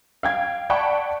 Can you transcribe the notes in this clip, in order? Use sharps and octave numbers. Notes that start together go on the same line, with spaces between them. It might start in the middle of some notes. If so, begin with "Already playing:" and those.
F5 G5 G#6
D5 F#5 G5 A5 B5 C#6